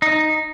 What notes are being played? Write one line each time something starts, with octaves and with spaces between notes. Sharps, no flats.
D#4